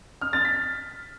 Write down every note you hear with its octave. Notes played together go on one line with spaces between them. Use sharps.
F6
A6
B6